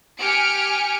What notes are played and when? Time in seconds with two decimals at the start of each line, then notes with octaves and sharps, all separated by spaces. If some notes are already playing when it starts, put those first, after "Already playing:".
0.20 G4 G#5 F6 C#7 D7